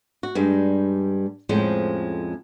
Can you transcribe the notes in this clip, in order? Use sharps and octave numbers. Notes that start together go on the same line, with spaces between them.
F#4
G2 G3 G#3
F2 A2 F3 G#3 C#4 C5